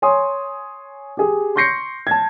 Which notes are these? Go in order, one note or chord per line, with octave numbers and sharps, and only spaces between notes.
C#5 G#5 C6 D#6
G4 G#4
C6 C#6 G6 A#6 C7 C#7
A5 G#6